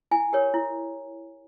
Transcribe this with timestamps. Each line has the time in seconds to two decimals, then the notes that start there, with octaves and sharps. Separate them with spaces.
0.11 E4 G#5
0.33 G4 A#4 C#5
0.54 E4